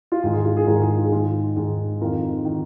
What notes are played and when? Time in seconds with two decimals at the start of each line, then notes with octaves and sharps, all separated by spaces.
0.12 F4
0.22 G#2 D#3 G#4
0.33 G#4
0.45 F4
0.57 G#4
0.67 G#2 D#3 F4 A#4
0.82 G#4
0.97 F4
1.05 G#4
1.12 G#2 D#3 F4
1.56 G#2 D#3 G#4
2.01 F2 D#3 F4 A#4
2.45 D#3